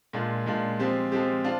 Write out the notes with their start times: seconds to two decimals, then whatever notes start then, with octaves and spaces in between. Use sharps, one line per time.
0.13 A#2 G#3 D4 F4
0.46 A#2 G#3 D4 F4
0.79 F3 G#3 C4 G4
1.12 F3 G#3 C4 G4
1.44 D4 F4 C5